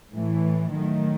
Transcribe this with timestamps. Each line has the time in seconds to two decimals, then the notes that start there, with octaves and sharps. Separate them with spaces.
0.12 A2 E3 A3
0.72 D#3 F#3 A3